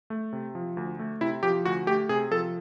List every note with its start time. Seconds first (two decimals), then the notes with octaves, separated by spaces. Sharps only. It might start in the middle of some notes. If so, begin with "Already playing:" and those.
0.10 A3
0.33 C3
0.55 F3
0.77 D2
0.99 A3
1.21 C3 E4
1.43 F3 G4
1.65 D2 F#4
1.87 A3 G4
2.09 C3 G#4
2.31 F3 A4